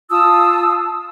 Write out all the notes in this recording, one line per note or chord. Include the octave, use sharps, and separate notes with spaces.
F4 A5 D#6 E6